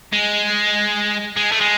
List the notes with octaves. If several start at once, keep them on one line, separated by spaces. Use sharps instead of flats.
G#3
G#3
A3
G#3